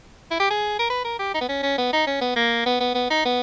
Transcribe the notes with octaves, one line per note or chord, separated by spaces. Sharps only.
E4
G4
G#4
A#4
B4
A#4
G4
D#4
B3
C#4
C#4
B3
D#4
C#4
B3
A#3
B3
B3
B3
D#4
B3